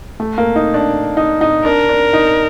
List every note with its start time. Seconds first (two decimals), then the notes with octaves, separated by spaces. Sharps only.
0.20 A3
0.38 A#3
0.56 D#4
0.74 D4
1.17 D#4
1.41 D#4
1.65 D4 A#4
1.89 D4
2.13 D#4